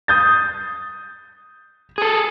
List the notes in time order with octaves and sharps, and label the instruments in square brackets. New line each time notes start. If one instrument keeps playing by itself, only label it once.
[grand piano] D#6 G6 A6
[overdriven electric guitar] G#4 A4